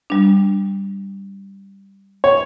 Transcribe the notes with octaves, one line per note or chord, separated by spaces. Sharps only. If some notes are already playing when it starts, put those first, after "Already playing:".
G3 D4
C#5